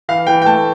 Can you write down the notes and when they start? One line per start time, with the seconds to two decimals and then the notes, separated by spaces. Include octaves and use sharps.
0.09 E3 F5
0.27 E3 G5
0.42 G5
0.45 A3 A5